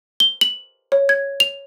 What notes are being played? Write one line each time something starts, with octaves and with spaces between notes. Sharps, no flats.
G7
F#7
C#5
G#6
F7